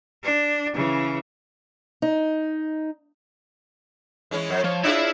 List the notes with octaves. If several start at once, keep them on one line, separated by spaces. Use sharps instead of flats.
D4
C#3 E3
D#4
E3 G#3 C#4
F2
F3 C#5
D4 E4 F4 G#4 E5